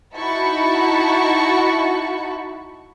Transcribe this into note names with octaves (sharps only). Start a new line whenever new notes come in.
D#4 E4 F#4 A5 B5 C#6